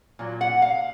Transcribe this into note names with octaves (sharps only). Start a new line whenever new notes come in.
A#2 F#3
F#5
F5